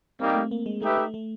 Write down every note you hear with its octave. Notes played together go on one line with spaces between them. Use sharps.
G3 A#3 C4 D#4 G4
A3
A#3
G#3
A3 D#4 G4 B4 E5
A3
A3